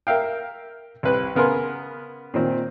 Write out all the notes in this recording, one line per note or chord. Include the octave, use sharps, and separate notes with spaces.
A#4 E5 F5 G5
C2 B4 F#6
C#3 B3 A#4 G#5 C6
A#2 D#3 C4